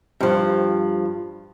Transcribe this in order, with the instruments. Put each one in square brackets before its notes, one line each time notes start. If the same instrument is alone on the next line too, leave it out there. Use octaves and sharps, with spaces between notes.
[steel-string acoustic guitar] G2 F3